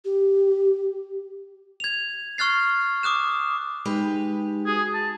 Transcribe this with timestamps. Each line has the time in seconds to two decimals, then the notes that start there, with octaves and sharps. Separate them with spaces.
0.05 G4
1.80 G#6 F7
2.38 C#6 F6 F#6 A6 C7
3.03 D6 D#6 F#6 E7
3.85 G#3 D#4 G4 B4 B5
4.66 F#4 G#4 D#6
4.94 A5